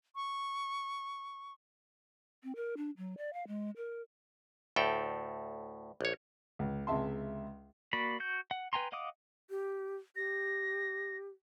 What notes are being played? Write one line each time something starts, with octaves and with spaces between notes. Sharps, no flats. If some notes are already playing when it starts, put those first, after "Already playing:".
C#6
C4
A#4
D4
F#3
D5
F5
G#3
A#4
D2 A2 A4 G5
A#1 C#5
C#2
C#2 C3 G#3 E5 A5 C6
A#3 F#4 D5 B5
F#4 G6
F#5
B4 G5 G#5 A#5 C6
D#5 F5 F#5 D6 D#6
G4
G4 A#6